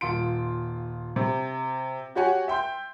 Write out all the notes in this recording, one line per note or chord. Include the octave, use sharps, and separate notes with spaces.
D#1 F4 C6 D7
C3
F#4 G4 C#5 F#5 G#5
E5 G5 C6 G6